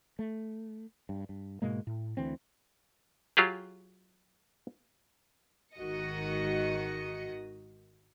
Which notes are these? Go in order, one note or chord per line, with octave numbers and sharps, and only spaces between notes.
A3
G2
G2
G#2 B2 G#3 A#3
A2
D2 D3 E3 C4
F#3 F4 G4 G#4
G#1 D#3 F#4 D#5 C#7